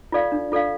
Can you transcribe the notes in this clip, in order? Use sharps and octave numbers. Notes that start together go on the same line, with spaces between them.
F4 A4 D5 F5
D4
F4 A4 D5 F5